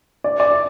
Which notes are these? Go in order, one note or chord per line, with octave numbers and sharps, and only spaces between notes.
D5
D5